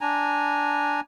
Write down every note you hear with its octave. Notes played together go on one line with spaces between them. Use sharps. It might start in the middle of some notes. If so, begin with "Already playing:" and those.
D4 G#5 A#5